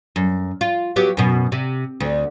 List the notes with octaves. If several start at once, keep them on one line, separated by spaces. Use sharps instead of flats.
F#2
F4
F#3 B3 G4
F#2 B2
C3
D2